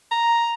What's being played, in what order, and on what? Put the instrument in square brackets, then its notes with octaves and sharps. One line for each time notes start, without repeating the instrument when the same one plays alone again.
[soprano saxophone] A#5